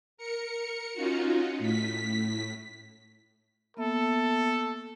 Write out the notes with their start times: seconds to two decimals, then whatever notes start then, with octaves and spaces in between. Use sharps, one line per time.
0.17 A#4 C#7
0.93 C#4 D#4 F4 F#4
1.59 A2 B6
3.77 A#3 B3 A4 E5